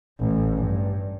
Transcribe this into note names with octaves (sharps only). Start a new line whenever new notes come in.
A1
G2